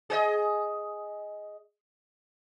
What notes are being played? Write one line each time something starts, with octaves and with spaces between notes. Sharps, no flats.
G#4 C5 D#5